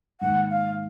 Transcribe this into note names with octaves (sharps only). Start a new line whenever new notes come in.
G#2 D#3 A#3 F#5
F5